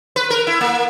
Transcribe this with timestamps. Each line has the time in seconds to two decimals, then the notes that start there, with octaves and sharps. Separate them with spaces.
0.16 B4
0.30 A#4
0.47 E4
0.61 A#3